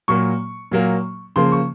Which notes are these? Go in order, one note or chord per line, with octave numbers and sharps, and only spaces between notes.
A#2 F#3 A#3 C#6
A#2 F#3 A#3
C#3 F3 A#3 C6
C#6